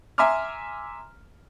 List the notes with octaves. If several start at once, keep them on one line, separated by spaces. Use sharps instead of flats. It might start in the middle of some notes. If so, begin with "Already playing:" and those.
E5 G#5 A#5 C6 D6 F6